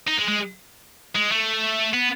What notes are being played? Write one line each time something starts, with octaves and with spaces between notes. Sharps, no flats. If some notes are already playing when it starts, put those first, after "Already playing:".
D#4
G#3
G#3
G#3
A3
B3